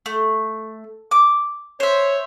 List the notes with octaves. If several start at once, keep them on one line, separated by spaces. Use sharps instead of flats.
A3
D6
C5 C#5 E5